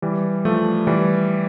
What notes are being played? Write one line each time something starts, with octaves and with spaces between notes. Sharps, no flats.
E3 G3
F3 A3
E3 G3